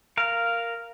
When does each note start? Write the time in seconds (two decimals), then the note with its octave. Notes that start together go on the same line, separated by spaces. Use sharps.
0.17 A#4 F5